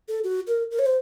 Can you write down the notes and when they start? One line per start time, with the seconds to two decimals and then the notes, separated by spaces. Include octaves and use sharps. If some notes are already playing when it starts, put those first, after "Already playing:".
0.09 A4
0.24 F#4
0.47 A#4
0.71 A#4
0.79 C#5
0.86 C5